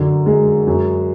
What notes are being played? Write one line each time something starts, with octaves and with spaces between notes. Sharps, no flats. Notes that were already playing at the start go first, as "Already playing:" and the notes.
Already playing: F#2 D3 F#3
G#3
F#2